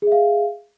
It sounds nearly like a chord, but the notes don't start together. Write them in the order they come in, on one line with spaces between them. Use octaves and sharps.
G#4 E5 F5